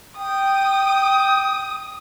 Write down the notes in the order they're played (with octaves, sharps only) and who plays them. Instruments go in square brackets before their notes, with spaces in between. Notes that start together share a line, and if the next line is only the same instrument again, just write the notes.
[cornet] G5 [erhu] D#6